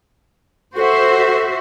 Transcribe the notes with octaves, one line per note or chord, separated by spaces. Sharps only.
F#4 A4 C5 E5